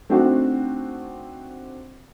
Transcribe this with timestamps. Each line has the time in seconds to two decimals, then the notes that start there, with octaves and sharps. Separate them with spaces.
0.09 A3 C4 D4 D#4 F#4